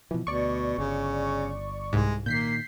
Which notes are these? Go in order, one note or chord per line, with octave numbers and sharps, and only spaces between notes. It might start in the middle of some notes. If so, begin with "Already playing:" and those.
B2 E3 F3
D2 B2 D5 C#6
G1 C#3
C2 G#2 G#3
A#2 D#3 A#3 G6 B6 C7